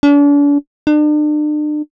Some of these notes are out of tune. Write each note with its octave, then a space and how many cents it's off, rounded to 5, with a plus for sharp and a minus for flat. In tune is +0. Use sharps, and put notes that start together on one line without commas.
D4 -40
D4 +40